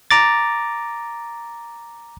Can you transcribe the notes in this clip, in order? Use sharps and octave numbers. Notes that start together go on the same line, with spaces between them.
A#5 D6 A6